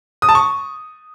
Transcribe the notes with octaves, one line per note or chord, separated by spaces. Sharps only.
D#6
A5
C#6